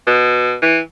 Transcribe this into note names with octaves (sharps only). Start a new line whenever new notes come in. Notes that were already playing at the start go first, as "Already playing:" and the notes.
B2
E3